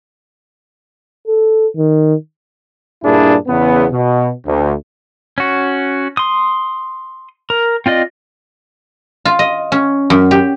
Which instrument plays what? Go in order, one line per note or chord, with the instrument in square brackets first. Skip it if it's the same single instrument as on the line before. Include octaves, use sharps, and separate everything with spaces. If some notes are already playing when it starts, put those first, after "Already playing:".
[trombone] A4
D#3
[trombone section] G2 A#2 D4 E4 G#4
E2 C#3 B3
B2
D2
[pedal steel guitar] C#4 F#4
C6 D#6
A#4
C4 F4 D5 D#5
[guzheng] F4
D#5
C#4
F#2
G4